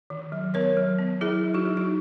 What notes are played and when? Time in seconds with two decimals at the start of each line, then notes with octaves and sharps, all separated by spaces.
0.10 D#3
0.32 F#3
0.54 B3 A#4 C#5
0.77 F#3
0.98 B3
1.21 F#3 E4 G#4
1.44 F#3
1.54 D#4 F#4
1.65 F#3
1.77 D#4